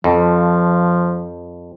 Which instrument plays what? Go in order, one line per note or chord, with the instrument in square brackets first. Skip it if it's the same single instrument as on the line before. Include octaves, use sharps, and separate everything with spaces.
[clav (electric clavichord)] F2 [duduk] F3